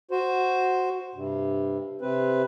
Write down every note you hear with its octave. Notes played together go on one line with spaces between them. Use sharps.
F#4 C5
G2 C3
C3 C4 B4